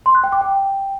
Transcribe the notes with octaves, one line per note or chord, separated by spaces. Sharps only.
C6
F#6
G5
D6
G5